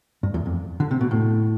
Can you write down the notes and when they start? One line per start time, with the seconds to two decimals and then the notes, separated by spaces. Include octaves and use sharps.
0.23 G2
0.34 E2
0.46 F2
0.80 D3
0.91 C3
1.01 B2
1.11 A2